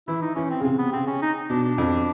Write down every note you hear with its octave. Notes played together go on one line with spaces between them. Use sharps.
E3 E4
D#4
E3 C#4
C4
C#3
C3 C4
B3
C#3 C4
C#4
D#4
B2 D4
D4
F2